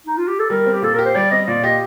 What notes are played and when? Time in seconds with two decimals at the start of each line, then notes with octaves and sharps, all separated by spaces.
0.07 D#4
0.17 F4
0.28 G4
0.39 A4
0.50 G3 A#4
0.66 C4
0.73 G4
0.82 A#2 A4
0.94 G4 A#4
1.05 C5
1.15 G3 D5
1.31 C4 D#5
1.48 A#2 D5
1.63 G4 D#5